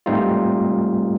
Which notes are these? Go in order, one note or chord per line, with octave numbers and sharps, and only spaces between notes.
G#2 G3 A3 C4 D#4 F4